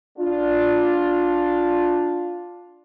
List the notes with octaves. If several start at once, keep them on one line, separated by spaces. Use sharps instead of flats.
D4 F4